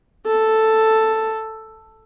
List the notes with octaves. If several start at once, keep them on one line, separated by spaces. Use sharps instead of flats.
A4